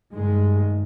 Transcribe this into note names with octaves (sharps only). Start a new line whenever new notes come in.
G2 D#3 G#3